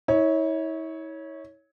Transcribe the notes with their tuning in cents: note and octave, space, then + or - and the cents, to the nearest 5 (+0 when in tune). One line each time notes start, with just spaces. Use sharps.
E4 -40 C#5 +0